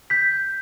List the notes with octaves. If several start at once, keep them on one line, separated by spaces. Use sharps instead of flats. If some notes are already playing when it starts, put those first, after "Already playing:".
G6 B6